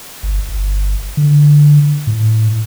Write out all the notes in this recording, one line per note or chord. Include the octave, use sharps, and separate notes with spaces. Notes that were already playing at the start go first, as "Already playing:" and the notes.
G1
G1
D3
A2